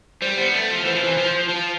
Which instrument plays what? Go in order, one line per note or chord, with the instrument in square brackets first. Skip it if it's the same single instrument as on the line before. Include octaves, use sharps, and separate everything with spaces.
[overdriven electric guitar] G3 [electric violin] C5
[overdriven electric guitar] B3
A3
F3
[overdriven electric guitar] E3 [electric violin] C5
[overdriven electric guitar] F3
E3
F3
F3